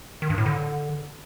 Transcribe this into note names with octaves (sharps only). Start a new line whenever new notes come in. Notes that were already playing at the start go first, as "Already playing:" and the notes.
D#3
G2
A2
D3